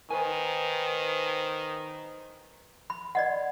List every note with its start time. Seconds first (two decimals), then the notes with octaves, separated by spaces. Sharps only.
0.10 D#3 B4 C5 G#5
2.90 B5
3.15 D5 D#5 F#5